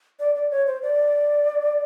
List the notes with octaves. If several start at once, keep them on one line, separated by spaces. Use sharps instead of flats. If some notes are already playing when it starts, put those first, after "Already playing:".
D5
D5
C#5
C5
D5